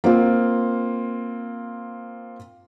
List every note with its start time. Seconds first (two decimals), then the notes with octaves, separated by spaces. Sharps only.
0.04 A#3 C4 F4